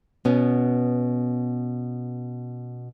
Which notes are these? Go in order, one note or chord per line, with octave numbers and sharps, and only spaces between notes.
B2 B3 C#4